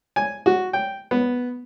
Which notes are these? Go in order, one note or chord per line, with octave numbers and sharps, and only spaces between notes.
G#5
F#4
G5
B3